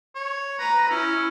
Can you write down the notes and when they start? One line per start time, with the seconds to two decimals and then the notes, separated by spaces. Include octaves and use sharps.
0.15 C#5
0.59 B4 A#5
0.90 C#4 E4